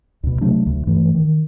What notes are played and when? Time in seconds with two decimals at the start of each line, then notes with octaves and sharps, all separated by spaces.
0.23 D2 B2
0.41 C3 F#3 A3 D4
0.66 D2
0.87 G2 E3 F3 A3
1.15 D#3